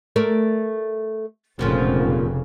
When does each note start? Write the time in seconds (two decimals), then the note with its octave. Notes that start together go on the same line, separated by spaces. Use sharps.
0.16 A3 A#4 D5
1.59 F1 F#2 A#2 C#3 F3